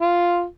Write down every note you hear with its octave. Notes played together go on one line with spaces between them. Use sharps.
F4